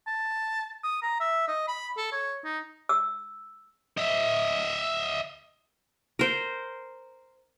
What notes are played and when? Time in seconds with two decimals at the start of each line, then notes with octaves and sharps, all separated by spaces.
0.07 A5
0.84 D#6
1.02 A#5
1.20 E5
1.48 D#5
1.68 B5
1.97 A4
2.12 C#5
2.44 D#4
2.89 E6
3.97 D#5 E5
6.19 A#4 C5